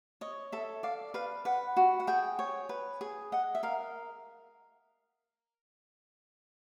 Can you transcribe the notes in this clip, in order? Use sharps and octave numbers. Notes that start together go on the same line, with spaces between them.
C#5 D#5
A4 E5
D5 F5
B4 F5
B4 F#5
F#4
F#5
G#4 G5
C#5
B4
G#4
D#5 F#5
E5
A#4 F5